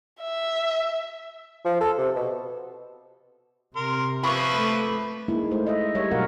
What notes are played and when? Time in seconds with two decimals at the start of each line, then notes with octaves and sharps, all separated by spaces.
0.21 E5
1.65 F3
1.81 A4
1.98 C3
2.16 B2
3.76 C3 A#4 C6
4.23 F3 A#3 B3 B4 E5 B5 C#6
4.55 A3
5.28 G#3 A#3 D#4 E4
5.51 A3 C5
5.67 D#5 E5
5.95 G3 A#4 C#5 E5
6.11 B2 F#3 F#4 A#4 F5 F#5